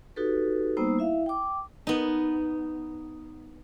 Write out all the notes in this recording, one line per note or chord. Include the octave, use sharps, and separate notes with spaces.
D#4 F#4 G4 A4 B4
G3 A#3 B3 D#4 C5 E6
E4 E5 F5
G5 D6
B3 D#4